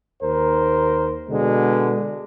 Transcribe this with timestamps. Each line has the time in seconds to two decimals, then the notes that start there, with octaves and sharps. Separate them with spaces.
0.23 D#2 A#4 C5
1.30 B2 D3 G#3